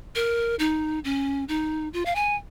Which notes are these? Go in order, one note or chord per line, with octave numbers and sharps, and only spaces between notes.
A#4
D#4
C#4
D#4
F4
F5
G#5